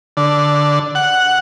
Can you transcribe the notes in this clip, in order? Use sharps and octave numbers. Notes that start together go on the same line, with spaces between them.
D3
F#5